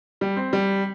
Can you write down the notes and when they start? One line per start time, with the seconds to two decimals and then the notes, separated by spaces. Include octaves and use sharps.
0.21 G3
0.36 C4
0.53 G3